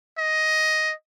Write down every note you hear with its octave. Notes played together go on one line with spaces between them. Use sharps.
D#5